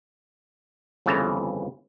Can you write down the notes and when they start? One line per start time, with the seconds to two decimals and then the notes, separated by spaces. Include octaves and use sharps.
1.06 G1 F2 C#3 E3 A5 A#5